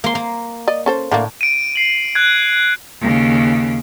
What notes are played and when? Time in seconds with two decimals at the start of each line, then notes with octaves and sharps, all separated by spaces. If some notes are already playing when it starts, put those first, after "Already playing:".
0.04 A#3 C6
0.15 A#3
0.68 D5 D#5
0.86 C#4 A4 C5
1.11 A2 D3 A3 A#3
1.41 D7 D#7
1.76 C7 F#7
2.15 F#6 G#6
3.00 D#2 C#3